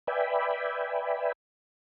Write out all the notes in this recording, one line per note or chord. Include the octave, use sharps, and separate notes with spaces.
B4 D5 E5 G5 G#5 B5